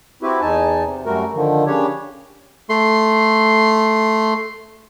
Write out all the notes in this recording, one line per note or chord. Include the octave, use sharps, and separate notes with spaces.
C4 E4 F#4 G4 B4
E2 D#4 G#5 A5
C3
F#2 G3 A3 F#4 A#4
D3 D#3 F3
C#3 D4 G4 C#5
A3 C6